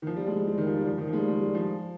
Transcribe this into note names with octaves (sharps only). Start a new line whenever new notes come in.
D#3
F3
G3
G#3
G3
G#3
G3
D#3
F3
G3
F3
D#3
F3
G#3
G3
G#3
G3
F3